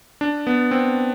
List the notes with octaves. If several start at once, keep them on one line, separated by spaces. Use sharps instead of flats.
D4
B3
C4